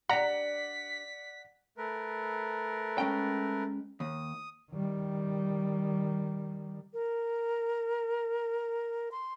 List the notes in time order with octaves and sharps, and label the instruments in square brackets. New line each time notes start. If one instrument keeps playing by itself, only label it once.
[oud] D4 G4 [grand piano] D5 F#5 [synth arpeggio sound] A#5 [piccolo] B6
[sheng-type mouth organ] A3 A#4 B4
[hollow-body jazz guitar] G#3 C#4 G5
[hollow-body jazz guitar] D#2 [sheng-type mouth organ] D#6
[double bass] D#3 G3
[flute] A#4
C6